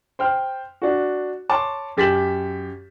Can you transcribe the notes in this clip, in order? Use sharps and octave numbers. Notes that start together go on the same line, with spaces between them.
C5 G5 F6
D4 F#4
C#5 A5 C6 D6
F#2 G4 A6 B6 E7 F#7